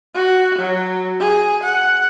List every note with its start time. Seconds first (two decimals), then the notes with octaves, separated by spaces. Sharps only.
0.14 F#4
0.58 F#3
1.20 G#4
1.63 F#5